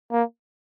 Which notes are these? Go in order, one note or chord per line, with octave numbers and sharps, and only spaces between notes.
A#3